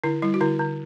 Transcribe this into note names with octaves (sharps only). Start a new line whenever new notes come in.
D3 E4
G3 E4
F#4
D3 E4
D3